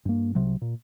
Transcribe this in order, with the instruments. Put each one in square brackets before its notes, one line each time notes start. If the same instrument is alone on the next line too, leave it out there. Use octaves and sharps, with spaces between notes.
[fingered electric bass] G2 A#3
C2 C3 F#3
A#2